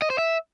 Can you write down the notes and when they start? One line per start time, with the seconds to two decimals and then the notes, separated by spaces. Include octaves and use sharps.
0.02 D#5
0.10 C5
0.18 E5